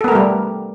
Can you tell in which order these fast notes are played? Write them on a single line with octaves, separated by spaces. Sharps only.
A4 B3 A#4 A3 G3